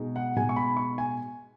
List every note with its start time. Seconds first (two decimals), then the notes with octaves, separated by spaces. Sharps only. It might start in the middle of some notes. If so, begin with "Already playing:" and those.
Already playing: B2 G#3 D#4
0.16 F#5
0.36 B2 G#3 D#4 G#5
0.49 C#6
0.56 B5
0.77 C#6
0.98 G#5